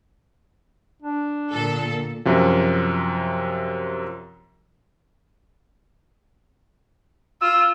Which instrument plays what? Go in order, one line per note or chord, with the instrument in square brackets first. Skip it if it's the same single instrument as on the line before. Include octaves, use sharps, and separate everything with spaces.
[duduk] D4
[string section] A#2 D3 A4
[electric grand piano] F#2 C3 F3
[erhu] F4 [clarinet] E6